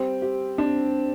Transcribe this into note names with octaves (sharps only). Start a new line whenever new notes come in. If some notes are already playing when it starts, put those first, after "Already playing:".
Already playing: G3 C4
G4
C4 D4